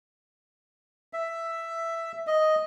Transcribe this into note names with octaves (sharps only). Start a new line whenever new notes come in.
E5
D#5